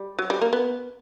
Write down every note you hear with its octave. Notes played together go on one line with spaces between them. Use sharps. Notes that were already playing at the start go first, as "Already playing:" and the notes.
Already playing: G3
F#3
G3
A#3
B3